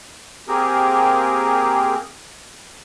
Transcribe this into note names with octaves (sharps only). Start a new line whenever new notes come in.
A#3 C4 G4 G#4 A#4